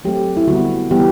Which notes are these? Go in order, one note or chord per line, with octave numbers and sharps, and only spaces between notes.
F#3 A3 C4 G4
E4
D3 G3 B3 F#4
E3 G3 B3 G4